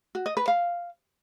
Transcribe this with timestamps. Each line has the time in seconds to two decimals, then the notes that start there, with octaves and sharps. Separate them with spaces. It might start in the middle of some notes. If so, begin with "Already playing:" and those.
0.15 F#4
0.26 D#5
0.37 B4
0.48 F5